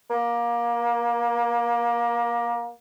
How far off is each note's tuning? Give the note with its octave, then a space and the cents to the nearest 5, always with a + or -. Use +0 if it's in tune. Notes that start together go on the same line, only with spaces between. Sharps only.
A#3 +25